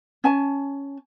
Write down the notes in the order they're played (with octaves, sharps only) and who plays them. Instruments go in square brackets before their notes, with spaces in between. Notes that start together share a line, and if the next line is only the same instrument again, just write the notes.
[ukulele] C#4 G#5 A5